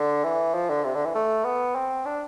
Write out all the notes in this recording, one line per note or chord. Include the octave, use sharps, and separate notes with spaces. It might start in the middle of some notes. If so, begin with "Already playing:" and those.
Already playing: D3
E3
F3
D3
C3
D3
E3
A3
B3
C4
D4